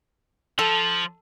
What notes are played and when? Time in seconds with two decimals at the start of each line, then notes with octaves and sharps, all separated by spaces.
0.59 F3 A4